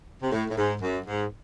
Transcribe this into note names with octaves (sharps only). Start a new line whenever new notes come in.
C3
A2
A2
G#2
F#2
G#2